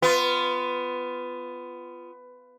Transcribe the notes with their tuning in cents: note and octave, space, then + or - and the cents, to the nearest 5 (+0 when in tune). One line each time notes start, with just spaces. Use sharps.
B3 +15 F4 -5